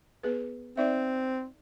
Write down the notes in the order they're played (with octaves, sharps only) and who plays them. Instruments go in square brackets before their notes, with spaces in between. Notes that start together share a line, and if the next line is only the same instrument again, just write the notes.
[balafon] B3 G#4 B4
[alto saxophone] C4 [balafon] D#4 D5 E5